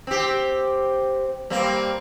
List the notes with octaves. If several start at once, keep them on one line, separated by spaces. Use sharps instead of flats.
C4 G4
G3 A#3 C4